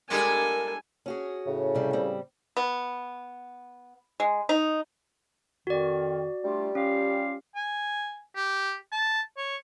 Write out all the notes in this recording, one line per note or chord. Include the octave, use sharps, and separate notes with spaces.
G3 G#3 A#3 D4 E4 A4 A#4 G#5
C#4 F#4 G#4
A2 C#3
C3 G3
G3 C4
B3
G#3
D#4
F2 D#3 F#4 D5
G3 A3 D4 F4
C#4 F4 G4 F5
G#5
G4
A5
C#5